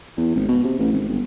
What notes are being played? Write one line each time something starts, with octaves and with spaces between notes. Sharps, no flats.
E2
G#1
B2
C3
A1
G#1
G1